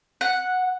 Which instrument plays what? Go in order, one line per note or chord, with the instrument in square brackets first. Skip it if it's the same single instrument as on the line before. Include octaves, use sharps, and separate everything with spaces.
[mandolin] F#5